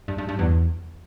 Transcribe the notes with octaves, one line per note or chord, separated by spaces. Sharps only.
G2
G2
G2
E2